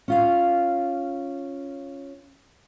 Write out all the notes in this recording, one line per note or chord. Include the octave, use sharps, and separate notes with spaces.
C#4 F4 F5